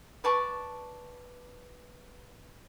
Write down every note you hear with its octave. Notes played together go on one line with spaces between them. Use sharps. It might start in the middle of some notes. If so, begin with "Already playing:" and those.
B4 D5 A5 C#6